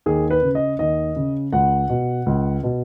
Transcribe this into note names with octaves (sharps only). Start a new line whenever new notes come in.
D#2 G#4
B4
C#3
D#5
D#2 D#5
C#3
C#2 F#5
B2
C#2
B2